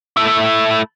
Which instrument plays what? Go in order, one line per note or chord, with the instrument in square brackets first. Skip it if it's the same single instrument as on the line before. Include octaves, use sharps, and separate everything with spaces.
[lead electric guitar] A3 E4